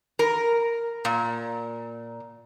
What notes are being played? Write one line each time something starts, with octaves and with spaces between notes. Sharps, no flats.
A#4
A#2